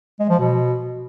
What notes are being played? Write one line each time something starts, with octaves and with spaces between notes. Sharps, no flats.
G#3
F3
B2